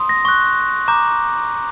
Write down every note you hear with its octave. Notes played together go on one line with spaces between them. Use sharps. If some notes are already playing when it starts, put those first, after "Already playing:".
Already playing: C6 D#6
A#6
C#6 F#6
A#5 D6 G6